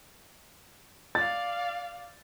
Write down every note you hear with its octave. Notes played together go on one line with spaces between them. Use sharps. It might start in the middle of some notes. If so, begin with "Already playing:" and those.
D5 F5 A6